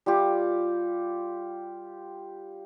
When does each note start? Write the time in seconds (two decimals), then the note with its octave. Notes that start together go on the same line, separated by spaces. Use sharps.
0.06 G3 F4 G4